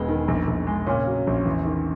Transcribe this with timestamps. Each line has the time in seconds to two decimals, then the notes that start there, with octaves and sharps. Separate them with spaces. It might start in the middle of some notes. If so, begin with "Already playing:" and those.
Already playing: E1 G#3 B3
0.08 D#3
0.28 A#1
0.47 A#1
0.67 G#3
0.86 A#2 C#3 C#4
1.07 F#3
1.27 A#1
1.46 E2
1.65 D#3